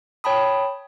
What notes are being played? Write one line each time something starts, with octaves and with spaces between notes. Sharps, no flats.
C#5 G5 A5 B5 D#6